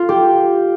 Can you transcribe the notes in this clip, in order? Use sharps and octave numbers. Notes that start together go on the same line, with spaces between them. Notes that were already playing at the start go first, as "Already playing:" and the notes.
Already playing: F4
G4